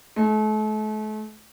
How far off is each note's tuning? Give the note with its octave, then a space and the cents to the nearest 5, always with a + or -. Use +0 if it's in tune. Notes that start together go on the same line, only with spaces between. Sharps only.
A3 -40